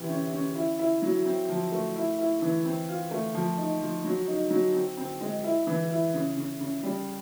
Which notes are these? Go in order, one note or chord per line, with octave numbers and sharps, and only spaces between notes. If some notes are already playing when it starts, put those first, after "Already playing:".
Already playing: C3 E3
C#4
C#4
E4
E4
F#3
C4
F3
A3
E4
E4
E3
C4
F4
A3
F3
D#4
F3
F#3
D#4
F#3
C4
C4
G#3
E4
E3
E4
C#3
C#3
C#3
G3